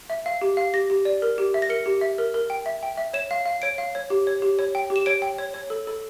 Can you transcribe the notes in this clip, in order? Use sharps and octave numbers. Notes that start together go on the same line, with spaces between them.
E5
F5
G4
F5
G4 A#6
G4
D5
A#4
G4
E5
A#6
A#4 C#7
G4
E5
A#4
A#4
G5
E5
G5
E5
C#5 E7
F5
F5
C#5 D7
F5
C#5
G4
C#5
G4
C#5
G5
G4
E7
C#5 D7
G5
C#5
C#5
A4
A4